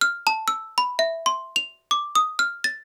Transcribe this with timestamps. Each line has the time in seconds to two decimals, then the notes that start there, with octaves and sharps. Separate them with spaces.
0.01 F6
0.27 A5
0.48 E6
0.78 B5
0.99 E5
1.26 C6
1.56 F7
1.91 D6
2.15 D#6
2.39 F6
2.64 A6